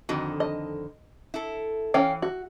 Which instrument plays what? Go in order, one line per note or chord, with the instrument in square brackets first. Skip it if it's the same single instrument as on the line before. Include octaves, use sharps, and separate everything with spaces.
[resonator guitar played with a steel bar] F2 D3 D#3 [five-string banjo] F#4
[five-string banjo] D#5
[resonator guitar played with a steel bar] E4 A4
[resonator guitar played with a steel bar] E3 [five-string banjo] C#4 F5 G5
[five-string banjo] F#4